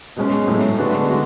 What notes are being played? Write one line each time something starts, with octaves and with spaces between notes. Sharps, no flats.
B2 G#3 C#4
A2 F#3 A3 E4
D3 G#3 B3 D4 F#4
D3 G#3 F#4